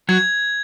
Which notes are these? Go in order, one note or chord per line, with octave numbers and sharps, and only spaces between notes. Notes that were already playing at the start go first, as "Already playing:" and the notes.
F#3 F#4 G#6